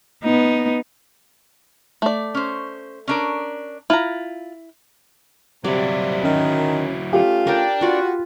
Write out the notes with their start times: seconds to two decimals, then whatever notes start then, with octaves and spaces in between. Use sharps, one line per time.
0.24 B3 D#4
2.02 A3 D5
2.34 C#4 C5
3.08 C#4 D4 A#4
3.90 E4 F4 A#5
5.64 C3 F#3 G3 E4 D5
6.23 D#3 C#4
7.13 A3 C#4 F4 G4
7.47 D4 A#4 G5
7.81 F4 F#4 B4